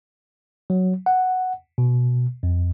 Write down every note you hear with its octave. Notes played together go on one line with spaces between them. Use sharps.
F#3
F#5
B2
F2